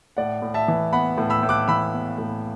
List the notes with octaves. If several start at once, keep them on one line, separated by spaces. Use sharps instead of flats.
A2 D5 F#5
A2
E5 A5
E3
B3 F#5 B5
A2
B5 E6
A2
D6 F#6
E3 B5 E6
B3
A2